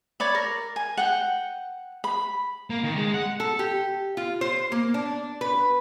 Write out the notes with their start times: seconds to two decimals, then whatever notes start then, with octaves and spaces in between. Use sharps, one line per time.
0.20 C#5 D5 B5
0.35 A#4
0.76 G#5
0.97 F#5 G5
2.04 B5
2.70 A#3
2.84 D#3
2.97 G#3
3.14 F#5
3.40 A4
3.59 G4
4.17 F4
4.41 C5
4.72 A#3
4.94 D4
5.41 B4